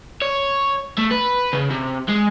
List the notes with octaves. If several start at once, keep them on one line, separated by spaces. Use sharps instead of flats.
C#5
A3
B4
C#3
C3
G#3